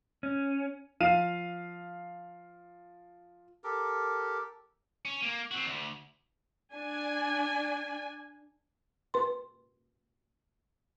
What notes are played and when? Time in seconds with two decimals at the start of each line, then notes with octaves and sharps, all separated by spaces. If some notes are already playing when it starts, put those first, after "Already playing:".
0.23 C#4
1.00 F3 F5 D#7
3.64 G4 A4 A#4
5.05 C#4
5.23 A#3
5.51 C4 F#4
5.66 D2
6.73 D4 G#5
9.14 B4 C6